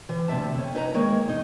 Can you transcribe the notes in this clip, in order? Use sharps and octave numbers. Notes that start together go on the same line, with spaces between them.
E3
D2 C3 D#3 E5 A5
F2 C#4
D#4 B4 A5 A#5
D#3 G#3 A#3 C#5
E2 D#4 D#5